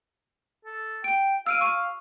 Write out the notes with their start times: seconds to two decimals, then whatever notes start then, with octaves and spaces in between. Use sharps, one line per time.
0.65 A4
1.04 G5 D7
1.46 F5 E6 D7 D#7
1.61 F5 C#6 D#7